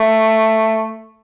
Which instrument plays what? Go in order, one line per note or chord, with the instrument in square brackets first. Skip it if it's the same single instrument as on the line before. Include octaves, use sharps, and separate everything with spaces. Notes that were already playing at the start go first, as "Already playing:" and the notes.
Already playing: [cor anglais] A3